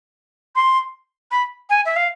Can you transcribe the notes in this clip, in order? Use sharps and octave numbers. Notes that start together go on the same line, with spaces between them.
C6
B5
G#5
E5
F5